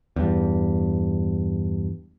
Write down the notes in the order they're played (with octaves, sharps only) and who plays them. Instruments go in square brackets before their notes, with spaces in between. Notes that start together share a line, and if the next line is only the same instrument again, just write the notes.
[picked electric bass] E2 G2